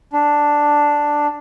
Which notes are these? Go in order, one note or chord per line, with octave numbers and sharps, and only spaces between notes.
D4